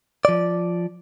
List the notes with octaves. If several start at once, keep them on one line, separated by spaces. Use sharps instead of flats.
F3 D5